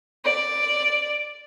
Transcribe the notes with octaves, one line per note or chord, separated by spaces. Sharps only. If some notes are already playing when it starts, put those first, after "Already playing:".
D5